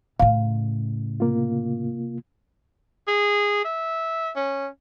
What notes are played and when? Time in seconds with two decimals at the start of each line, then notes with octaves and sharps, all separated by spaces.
0.20 A2 C#3 F5
1.20 C3 A#3 F4
3.08 G#4
3.64 E5
4.36 C#4